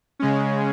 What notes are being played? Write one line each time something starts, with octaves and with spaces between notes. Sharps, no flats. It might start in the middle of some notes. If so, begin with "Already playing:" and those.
C#3 G#3 C#4